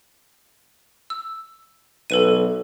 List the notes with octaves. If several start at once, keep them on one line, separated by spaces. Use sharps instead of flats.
E6
B1 A4 B4 D#7